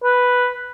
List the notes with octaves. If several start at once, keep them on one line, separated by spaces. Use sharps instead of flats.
B4